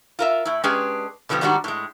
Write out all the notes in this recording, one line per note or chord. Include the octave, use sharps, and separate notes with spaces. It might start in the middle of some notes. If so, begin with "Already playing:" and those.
F4 A#4 E5
A2 E4
G#3 C#4 D4 G4 G#4 B4
B2 D3 F3 G3 B3
G#2 D#3 G3 D4 F#4
A2 G#3